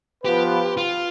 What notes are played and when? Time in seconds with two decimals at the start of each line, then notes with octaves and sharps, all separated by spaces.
0.24 F3 B3 F4 G4 B4
0.77 F4